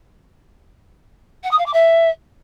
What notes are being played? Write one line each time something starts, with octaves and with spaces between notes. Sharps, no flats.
F#5
D#6
F5
D6
E5